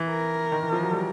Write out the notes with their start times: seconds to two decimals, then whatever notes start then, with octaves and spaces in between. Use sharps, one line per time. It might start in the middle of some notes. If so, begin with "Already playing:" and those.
Already playing: E3
0.10 A#4
0.52 D#3
0.62 E3
0.72 F3
0.83 F#3
0.93 G3